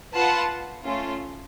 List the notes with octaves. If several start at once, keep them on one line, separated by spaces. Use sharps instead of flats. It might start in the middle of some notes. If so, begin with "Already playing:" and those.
F4 B4 F#5 A5
A3 C#4 F4